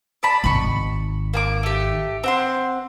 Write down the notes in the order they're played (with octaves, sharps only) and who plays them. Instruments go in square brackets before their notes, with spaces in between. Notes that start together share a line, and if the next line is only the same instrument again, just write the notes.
[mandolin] D5 A5 B5
[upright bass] G#1 D#3 [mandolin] B5 C#6
[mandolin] A#3 G#5 D6
A3 G4
C4 F#5 C6